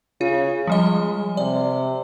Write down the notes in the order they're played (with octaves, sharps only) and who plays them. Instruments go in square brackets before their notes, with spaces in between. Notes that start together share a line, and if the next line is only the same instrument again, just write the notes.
[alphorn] C#3 [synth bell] F4
[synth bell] F3 G3 D#5 [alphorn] G#3
[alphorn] C3 [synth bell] D5